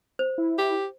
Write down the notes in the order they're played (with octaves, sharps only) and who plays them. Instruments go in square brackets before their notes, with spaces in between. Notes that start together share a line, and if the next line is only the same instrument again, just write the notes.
[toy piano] C5
[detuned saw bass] E4
[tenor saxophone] G4